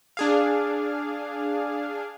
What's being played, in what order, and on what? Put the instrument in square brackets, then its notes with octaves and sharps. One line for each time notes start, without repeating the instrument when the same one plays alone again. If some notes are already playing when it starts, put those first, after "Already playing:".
[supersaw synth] D4 G#4 F5